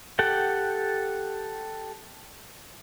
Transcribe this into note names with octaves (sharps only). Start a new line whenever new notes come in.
G4 A4 F#5 G5